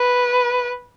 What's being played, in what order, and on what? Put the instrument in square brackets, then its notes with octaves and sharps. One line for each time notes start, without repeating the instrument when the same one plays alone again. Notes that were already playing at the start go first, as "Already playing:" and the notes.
Already playing: [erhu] B4